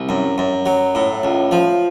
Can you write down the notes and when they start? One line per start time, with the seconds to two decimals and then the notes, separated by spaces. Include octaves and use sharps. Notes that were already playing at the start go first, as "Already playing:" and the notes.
Already playing: C2
0.09 F#2
0.38 F#2
0.66 F#3
0.95 A2
1.23 C#2
1.51 F3